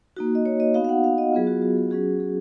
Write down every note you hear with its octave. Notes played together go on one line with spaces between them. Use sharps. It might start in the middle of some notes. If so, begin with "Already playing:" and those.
A#3 D#4 F#4
D#5
C#5
D#5
B3 D#4 F#4 F5
F5
F#5
F5
D#5
F#3 B3 F4 G#4
F#4
F#4
G#4
F#3 C#4 F#4 G#4
G#4